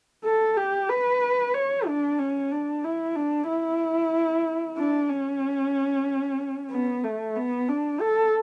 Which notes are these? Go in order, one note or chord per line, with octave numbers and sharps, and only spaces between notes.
A4
G4
B4
C#5
D4
C#4
D4
E4
D4
E4
D4
C#4
B3
A3
B3
D4
A4